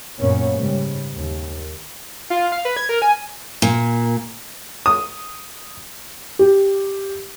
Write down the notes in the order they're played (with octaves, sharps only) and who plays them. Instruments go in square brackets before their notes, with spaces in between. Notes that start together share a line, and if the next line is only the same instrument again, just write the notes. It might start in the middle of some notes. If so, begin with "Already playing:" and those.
[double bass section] F#2 A#2 A#3 B3 C#4
G#2 C#3 G3
D#2
[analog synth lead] F4
F5
B4
G#6
A#4
G#5
[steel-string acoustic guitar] A#2
[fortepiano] D#6
[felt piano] G4